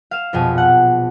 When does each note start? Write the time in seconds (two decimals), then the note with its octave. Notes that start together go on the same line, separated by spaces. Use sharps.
0.11 F5 E7
0.33 A#1 F2 B2 G#5
0.58 F#5